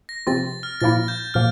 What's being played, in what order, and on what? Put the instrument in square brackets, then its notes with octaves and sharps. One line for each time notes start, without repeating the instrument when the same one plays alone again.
[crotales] A#6
[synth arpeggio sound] C3 F3 C4 F4 [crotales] A6
[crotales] F6
[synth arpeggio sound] A#2 F3 A#3 E4 [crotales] A6
[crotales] G6
[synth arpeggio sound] A#2 F3 A#3 [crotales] F6